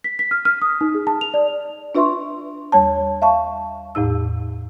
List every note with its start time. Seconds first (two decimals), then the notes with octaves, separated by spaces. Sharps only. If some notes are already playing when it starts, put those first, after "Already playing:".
0.04 B6
0.19 B6
0.31 F6
0.45 F6
0.62 D#6
0.81 D#4
0.94 G#4
1.07 A5
1.21 F7
1.34 D5
1.95 D4 F4 B4 E5 C6 C#6
2.72 D#2 G3 C#5 A5
3.22 E5 F5 A5 C#6
3.95 E2 A2 D#4 E6